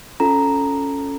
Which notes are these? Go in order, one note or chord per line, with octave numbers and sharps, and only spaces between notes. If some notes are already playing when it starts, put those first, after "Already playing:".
C#4 F4 A4 A#5